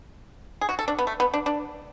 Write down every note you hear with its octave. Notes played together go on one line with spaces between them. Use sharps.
G#4
F#4
A4
D4
B3
A3
B3
D4
D4